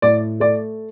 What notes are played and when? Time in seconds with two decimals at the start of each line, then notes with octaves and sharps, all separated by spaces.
0.02 A2 D5
0.40 A3 D5